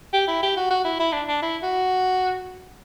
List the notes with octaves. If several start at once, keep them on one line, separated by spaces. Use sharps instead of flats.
G4
E4
G4
F#4
F#4
E4
E4
D4
D4
E4
F#4